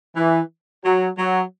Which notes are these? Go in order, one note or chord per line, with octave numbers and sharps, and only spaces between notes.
E3
F#3
F#3